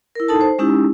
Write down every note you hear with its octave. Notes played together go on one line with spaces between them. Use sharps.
E4 A#4
D#4 A4 A5
C5
G#3 C#4 D#4 E4 G4